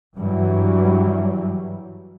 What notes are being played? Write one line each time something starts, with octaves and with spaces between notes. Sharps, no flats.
G2 E3 F#3 G3